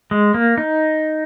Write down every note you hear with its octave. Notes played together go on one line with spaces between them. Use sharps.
G#3
A#3
D#4